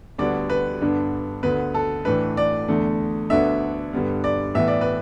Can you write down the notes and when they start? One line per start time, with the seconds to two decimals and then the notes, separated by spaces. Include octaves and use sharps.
0.18 D2 D3 G3 B3 D4 D5
0.50 B4
0.81 G2 D3 B3 D4
1.43 D2 D3 B3 B4
1.74 A4
2.05 A2 E3 A3 D4 B4
2.37 D5
2.68 E2 D3 A3 D4
3.30 D2 D3 B3 D4 E5
3.93 G2 D3 G3 B3
4.24 D5
4.54 A2 E3 B3 E5
4.68 D5
4.81 B4